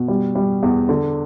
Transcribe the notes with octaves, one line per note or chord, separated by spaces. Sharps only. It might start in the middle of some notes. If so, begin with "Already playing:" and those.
Already playing: B2
G3
G3
E2
D3